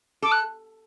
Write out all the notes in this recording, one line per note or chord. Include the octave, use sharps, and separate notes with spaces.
A4 D6
F#6